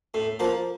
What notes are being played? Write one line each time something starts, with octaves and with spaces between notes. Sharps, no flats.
A2
F3 A#3